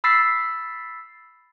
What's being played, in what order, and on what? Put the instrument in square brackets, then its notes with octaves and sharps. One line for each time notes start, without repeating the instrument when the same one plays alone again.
[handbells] B5 E6 A6 B6 C7